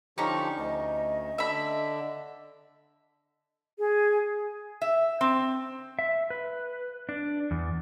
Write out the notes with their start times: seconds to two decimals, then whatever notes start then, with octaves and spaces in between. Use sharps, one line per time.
0.18 D3 F3 C#4 D#4 G4 C#6
0.58 D2 D#5
1.38 D3 E5 B5
3.79 G#4
4.82 E5
5.21 C4
5.99 E5
6.30 B4
7.09 D4
7.51 E2